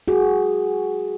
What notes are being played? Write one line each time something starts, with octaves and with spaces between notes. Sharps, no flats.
F#4 G#4